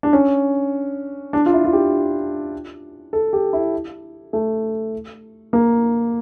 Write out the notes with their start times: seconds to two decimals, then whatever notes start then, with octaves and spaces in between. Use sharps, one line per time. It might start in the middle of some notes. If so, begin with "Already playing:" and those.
0.03 D4
0.13 C#4
1.33 D4
1.46 F4
1.53 E4
1.64 F4
1.73 G4
3.13 A4
3.33 G4
3.53 E4
4.33 A3
5.53 A#3